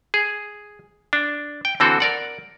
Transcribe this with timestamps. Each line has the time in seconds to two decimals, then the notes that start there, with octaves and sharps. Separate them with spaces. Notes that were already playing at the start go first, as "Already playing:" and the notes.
0.14 G#4
1.13 D4
1.65 G5
1.80 D3 E3 C4 F#4 A4
2.00 A#4 D5 F#5